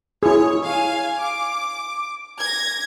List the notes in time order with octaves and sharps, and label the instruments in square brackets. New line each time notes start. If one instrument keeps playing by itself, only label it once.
[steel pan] E4 G#4 [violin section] C#5
[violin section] F5 G#5
D6
G#6 A#6